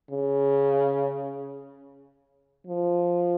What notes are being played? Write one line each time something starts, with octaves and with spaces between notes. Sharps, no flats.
C#3
F3